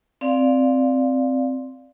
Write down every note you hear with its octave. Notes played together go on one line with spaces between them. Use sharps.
C4 D5 F5